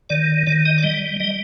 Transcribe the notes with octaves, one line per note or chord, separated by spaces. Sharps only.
D#3 D5
D#3 D5
D#5
D5
G3 D#5
G3 D#5